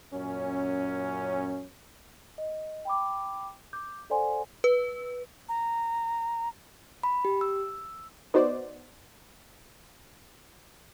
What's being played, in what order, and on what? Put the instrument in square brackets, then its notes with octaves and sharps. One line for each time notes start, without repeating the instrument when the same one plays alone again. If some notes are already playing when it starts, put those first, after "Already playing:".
[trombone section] F#2 A#2 C#4
[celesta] D#5
G5 B5 D6
D6 G6
A4 C5 D5 F#5 G#5 C6
[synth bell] B4
[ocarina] A#5
[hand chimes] B5
G4
E6
[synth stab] B3 D#4 F#4 C5 D5